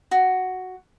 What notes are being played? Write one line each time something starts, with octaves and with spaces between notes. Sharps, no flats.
F#4